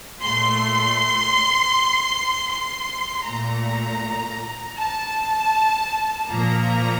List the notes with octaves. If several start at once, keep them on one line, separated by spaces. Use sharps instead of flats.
A#2 A3 C6
C6
A#2 A3 A#5
A5
A#2 F3 A#3 A#5